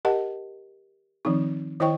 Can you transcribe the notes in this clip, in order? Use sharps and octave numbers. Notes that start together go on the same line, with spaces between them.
G4 A#4 D#5 F#5 A5
D#3 F3 C4 D#4
D#3 E4 C5 D#5 G5 C#6